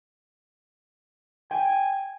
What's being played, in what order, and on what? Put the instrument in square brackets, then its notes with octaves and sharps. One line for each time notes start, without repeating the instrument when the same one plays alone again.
[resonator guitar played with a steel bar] G5 [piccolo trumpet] G#5